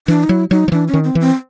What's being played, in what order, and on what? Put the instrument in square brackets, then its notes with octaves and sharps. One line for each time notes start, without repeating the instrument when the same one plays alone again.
[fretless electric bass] E3 [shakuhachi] D4
[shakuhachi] D#4
[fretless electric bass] F#3 [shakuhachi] E4
[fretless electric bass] F#3 [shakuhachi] D#4
[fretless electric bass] F3
[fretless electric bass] E3 [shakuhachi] D4
[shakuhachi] C#4
[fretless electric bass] D#3
[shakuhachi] C4
[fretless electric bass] E3
[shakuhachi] C4